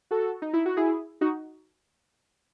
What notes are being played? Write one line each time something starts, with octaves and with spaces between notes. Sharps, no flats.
F#4 A4
D#4
E4
F#4
E4 G#4
D#4 F#4